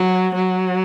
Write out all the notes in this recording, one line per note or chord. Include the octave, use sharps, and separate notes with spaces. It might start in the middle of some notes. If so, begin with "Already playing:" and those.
Already playing: F#3
F#3